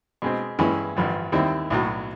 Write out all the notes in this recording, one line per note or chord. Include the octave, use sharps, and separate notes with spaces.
B2 G#3 C4
G2 E3 G#3 C#4 E4
A1 G2 D3 F3
D#2 D#3 G3 C4 E4
B1 A2 F#3